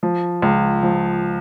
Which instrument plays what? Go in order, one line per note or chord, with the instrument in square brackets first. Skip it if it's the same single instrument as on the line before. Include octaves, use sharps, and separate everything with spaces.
[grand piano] F3
C#2
F3